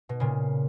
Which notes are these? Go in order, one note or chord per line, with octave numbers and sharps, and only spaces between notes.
B2
A#2 C#3